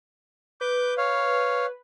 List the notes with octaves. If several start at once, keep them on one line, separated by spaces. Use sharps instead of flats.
B4 D6 G6
C#5 F5